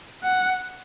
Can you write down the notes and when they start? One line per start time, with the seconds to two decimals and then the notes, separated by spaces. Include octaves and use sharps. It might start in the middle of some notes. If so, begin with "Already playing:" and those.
0.24 F#5